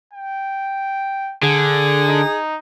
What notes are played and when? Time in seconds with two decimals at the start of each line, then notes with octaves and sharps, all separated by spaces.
0.13 G5
1.43 D3 G#4
2.09 D#4